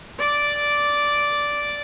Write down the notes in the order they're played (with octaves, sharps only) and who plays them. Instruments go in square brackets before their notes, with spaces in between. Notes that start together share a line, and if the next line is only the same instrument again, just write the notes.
[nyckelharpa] D5 D6